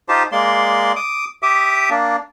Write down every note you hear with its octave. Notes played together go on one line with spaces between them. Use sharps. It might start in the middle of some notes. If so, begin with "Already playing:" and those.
D#4 F4 G4 C5 A5
G#3 A#3 D5 C6
D6 D#6
G4 E5 D6 D#6
A#3 D4